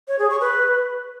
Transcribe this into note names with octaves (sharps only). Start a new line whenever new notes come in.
C#5
G#4
C#6
B4